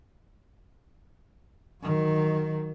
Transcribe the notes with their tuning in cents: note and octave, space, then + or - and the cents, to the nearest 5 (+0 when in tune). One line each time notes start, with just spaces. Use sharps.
D#3 +0 F#3 +0